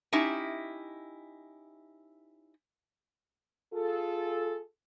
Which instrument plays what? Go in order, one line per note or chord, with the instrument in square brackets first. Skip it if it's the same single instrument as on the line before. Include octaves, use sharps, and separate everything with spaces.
[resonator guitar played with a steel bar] C#4 D#4 E4 G4 E5
[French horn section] F4 G#4 A4